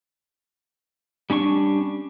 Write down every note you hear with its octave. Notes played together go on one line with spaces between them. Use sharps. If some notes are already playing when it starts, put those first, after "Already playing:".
G3 C#4 D4 C#6